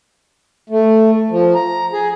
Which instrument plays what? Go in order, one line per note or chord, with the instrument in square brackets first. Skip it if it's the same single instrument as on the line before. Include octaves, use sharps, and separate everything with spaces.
[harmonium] A3
F3
A#5
G#4